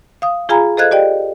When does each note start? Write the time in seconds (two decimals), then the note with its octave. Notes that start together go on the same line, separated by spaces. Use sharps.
0.22 F5 D#6
0.49 F4 G#4 F5 G#5 A#5 B5
0.77 A4 C5 D#5 F5 F#6 G#6
0.91 G4 D5 D#5 G5